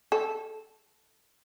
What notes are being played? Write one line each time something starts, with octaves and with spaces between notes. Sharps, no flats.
A4